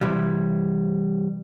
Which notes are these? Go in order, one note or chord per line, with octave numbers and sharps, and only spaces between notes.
C3 E3 G3